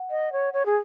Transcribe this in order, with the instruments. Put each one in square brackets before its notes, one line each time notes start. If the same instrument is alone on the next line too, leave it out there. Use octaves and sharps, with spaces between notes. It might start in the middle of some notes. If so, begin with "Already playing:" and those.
Already playing: [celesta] F#5
[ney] D#5
C#5
C#5
G#4